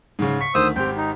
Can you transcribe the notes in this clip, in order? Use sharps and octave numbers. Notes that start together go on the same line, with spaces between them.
G#2 C#3
C#6 B6
D2 D#3 C5 D#6 E6
G#1 C4 G4 G5
D#4